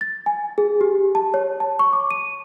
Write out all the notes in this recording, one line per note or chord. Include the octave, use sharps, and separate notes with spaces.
A6
G#5
G#4
G4
A5
C#5
A5
C#6
D6
D#7